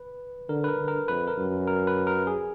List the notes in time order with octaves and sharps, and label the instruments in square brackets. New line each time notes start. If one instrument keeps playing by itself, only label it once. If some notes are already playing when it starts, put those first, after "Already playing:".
Already playing: [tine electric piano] B4
[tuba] D3 [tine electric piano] A#4
[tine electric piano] B4
A#4
[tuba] D3
[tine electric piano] A#4
[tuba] F2 [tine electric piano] B4
[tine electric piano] A#4
[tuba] F#2
[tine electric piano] A#4
B4
A#4
G#4